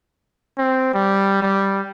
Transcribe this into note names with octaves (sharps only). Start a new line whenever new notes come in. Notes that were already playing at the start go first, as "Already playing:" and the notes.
C4
G3
G3